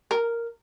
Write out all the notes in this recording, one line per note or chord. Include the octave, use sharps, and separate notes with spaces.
A#4